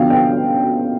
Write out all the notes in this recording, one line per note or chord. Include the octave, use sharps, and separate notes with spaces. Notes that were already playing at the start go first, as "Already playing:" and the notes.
Already playing: D3 F3 B3 F5 G5
G5